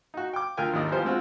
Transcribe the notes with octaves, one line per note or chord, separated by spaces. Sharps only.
D#4 F#4
G5 D6
D2 F4 A#4 G5 G#5
G#1 D#2 D#3 D5 D#5
E3 F3 G3 B3 G4 C5
G#3 C4 F4 F#4